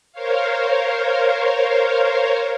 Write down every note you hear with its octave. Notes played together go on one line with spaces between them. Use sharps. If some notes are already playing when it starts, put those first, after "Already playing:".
A#4 C5 C#5 F5